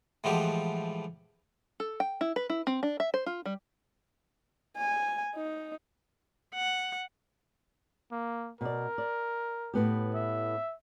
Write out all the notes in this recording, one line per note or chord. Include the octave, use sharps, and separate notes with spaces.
A2 E3 F3 G#3 F#4 G4
A4
G5
E4
B4
E4
C4
D4
E5
C5
F4
G3
G#5
D#4
F#5
A#3
B2 A#4 D5
D5
A2 B3 G4
E5